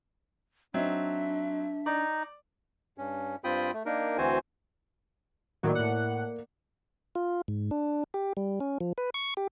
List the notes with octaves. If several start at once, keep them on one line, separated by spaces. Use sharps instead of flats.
F#3 C4 D4 D#4 E5
D#4 D5
G2 C#4
G2 C4 F4 G5 B5 D#6
A3
A#3 D4 D#4 A#4
D2 E3 C4 F#4 C5 G#5
A2 D#3 F#3 A#3 D5
A2 F#5
F4
G#2
D4
G4
G3
C#4
F3
B4
C#6
G4